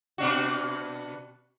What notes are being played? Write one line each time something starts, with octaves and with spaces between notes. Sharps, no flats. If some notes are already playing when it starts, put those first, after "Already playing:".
B2 D4 F#4